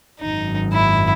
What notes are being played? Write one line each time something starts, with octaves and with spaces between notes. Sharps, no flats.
G#1 F#2 D#3 D#4
E4